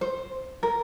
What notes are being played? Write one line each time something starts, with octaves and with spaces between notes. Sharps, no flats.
C5
A#4